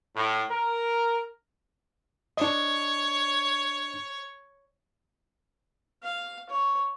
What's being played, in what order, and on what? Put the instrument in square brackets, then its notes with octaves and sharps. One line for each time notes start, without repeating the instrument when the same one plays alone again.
[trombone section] A2
A#4
[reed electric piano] D4 D#5 [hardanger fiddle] C#5
[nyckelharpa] F5
C#5